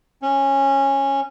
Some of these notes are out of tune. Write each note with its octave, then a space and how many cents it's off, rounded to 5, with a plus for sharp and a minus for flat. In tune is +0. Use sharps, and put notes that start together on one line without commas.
C#4 -15